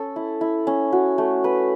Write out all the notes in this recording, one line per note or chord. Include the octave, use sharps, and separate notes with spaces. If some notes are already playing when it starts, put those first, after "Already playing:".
Already playing: C#4 A4
E4
E4
C#4
F#4
A3
B4